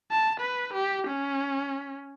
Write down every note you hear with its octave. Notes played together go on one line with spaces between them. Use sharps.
A5
B4
G4
C#4